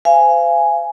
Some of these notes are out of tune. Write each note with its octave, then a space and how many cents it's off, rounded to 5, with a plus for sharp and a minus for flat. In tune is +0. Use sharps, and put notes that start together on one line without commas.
C5 -40 F5 -35 G#5 +0